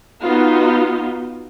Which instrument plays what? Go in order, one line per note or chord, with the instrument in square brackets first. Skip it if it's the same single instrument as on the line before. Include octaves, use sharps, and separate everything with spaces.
[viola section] B3 D#4 F4 F#4